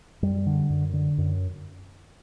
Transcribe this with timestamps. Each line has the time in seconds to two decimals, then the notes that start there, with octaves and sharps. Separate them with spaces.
0.22 F#2 G3
0.46 D3
0.70 F#2
0.93 D3
1.18 F#2